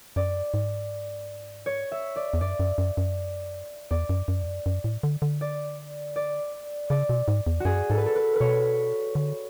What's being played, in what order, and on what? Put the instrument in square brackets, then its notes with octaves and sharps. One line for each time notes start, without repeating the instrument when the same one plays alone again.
[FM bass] F#2 [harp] D5
[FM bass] G#2
[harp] C#5
E5
D5
[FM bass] E2
[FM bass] F#2 [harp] D5
[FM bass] F#2
F#2
F#2
[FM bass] E2 [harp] D5
[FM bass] F#2
F#2
E2
F#2
F#2
A2
D3
D3
[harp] D5
D5
[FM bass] C#3 [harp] D5
[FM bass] B2
G#2
E2
[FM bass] F#2 [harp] F#4 G#4
[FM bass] G#2 [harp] A4
[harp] B4
A4
B4
[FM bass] B2 [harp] B4 C#5
[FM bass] D3